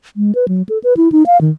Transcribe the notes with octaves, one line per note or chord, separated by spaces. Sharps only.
G#3
B4
F#3
A4
B4
E4
D#4
F5
D#3